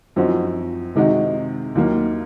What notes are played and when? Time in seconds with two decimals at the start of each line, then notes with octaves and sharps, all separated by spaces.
0.16 F#2 F3 C4 D#4 F#4
0.96 C3 D#3 G#3 D#4 F#4
1.75 D#2 D#3 F#3 A#3